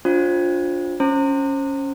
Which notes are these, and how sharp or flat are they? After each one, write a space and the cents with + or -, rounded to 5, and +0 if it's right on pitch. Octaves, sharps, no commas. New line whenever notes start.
D4 -20 F4 +20 C5 +20
C#4 +0 C5 +30 A#5 -35